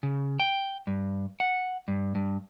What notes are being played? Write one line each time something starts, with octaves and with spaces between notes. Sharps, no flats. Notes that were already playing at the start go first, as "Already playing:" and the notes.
C#3
G5
G2
F#5
G2
G2